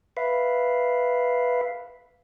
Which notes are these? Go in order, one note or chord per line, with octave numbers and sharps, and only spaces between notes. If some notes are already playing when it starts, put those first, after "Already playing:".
B4 E5 F5